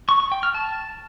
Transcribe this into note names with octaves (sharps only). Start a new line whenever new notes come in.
C#6
C#6
G5
F6
A5